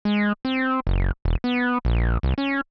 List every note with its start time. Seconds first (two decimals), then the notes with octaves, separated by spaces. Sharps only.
0.05 G#3
0.45 C4
0.87 F#1
1.25 E1
1.44 B3
1.85 A#1
2.23 C2
2.38 C#4